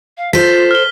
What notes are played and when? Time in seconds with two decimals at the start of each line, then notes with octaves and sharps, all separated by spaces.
0.17 F5
0.33 F4 A4 C5 B6
0.71 F6 G7